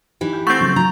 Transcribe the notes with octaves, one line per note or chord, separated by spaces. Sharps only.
E3 D#4 G4
G6
A3 C4 F#5 C#6 G6 A6
C#3 F3 F#3
E3 F#3 A#5